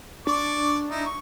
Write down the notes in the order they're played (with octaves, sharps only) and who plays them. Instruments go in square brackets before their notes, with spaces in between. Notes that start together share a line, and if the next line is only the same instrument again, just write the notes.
[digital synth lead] D4 [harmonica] D5 C#6 D6
[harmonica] D#4 E4
C#6